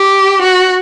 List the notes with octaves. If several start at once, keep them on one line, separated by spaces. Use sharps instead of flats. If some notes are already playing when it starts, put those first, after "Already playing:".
Already playing: G4
F#4